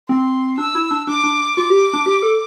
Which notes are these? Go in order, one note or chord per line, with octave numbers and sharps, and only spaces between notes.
C4 C6
D4 E6
E4
D4
D4 D6
D4
F4 D6
G4
D4
G4
A4